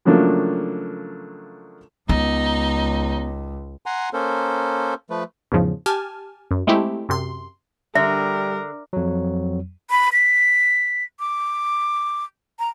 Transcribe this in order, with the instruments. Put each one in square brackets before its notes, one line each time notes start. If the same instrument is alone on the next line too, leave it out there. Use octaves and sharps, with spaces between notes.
[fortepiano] C#3 F3 F#3 A3 A#3 D4
[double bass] C#2 [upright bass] B3 [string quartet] D#4
[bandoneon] F#5 G#5 A#5 C6
A#3 C#4 A4 A#4 C5
F3 A3 B4
[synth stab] E2 G#2 C#3 F3
G4 G#5 A5 F6
F#2
G#3 A3 C4 E4 G4
F#2 C3 C6
[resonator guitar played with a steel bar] D3 [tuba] G3 [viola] A#4 [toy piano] E5
[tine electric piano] F2 F#3
[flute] B5
B6
D6
A#5